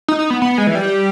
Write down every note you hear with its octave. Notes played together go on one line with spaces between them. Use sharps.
D#4
D#4
B3
B3
G#3
E3
G3